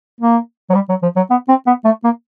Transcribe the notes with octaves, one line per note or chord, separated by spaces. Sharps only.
A#3
F#3
G3
F#3
F3
F#3
B3
C4
B3
A3
A#3